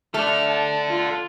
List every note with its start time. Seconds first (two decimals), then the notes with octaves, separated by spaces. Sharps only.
0.14 A3 A4 D5 F6
0.48 A5
0.89 F4